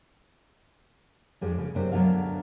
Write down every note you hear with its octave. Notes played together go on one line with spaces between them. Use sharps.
F2 G#3 D4
C#3
F#2 C3 D4 C5
D2 F#3 B3 D4 F5